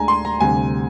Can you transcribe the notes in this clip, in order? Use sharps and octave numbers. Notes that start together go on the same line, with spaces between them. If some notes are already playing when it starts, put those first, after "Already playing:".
Already playing: D2 D3 G#3 D4 G#5 A#5
C6
A#5
D2 C3 G3 G#5